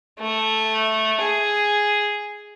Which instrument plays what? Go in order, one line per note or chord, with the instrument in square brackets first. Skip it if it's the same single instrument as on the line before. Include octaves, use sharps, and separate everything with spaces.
[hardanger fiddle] A3
G#4